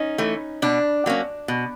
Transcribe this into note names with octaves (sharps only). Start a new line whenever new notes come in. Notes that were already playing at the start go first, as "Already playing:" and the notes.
Already playing: C#4 D#4
E3 A3
B2 D4
F#3 A#3 C#4
B2